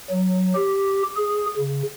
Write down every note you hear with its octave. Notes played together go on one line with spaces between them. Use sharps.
F#3
G4
G#4
C#3